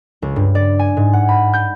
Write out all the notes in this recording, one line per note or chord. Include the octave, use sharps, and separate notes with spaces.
C#2
G2
D5
G#5
G#2
F#5
B5
G6